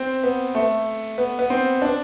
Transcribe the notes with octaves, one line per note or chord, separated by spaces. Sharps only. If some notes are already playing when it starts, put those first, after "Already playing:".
Already playing: C4
B3
A3
B3
B3
C4
D4